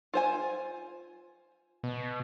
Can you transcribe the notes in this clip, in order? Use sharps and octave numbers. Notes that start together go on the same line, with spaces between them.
F4 C5 G#5
B2